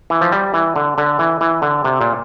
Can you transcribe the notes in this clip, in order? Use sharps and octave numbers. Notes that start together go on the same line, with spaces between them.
E3
F3
G3
E3
D3
D3
E3
E3
D3
C3
A#2